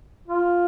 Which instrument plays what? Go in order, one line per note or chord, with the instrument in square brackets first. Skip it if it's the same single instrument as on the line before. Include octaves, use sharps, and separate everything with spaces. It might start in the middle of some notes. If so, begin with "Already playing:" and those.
[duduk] F4